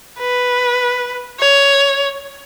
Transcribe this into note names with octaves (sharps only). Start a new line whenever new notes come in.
B4
C#5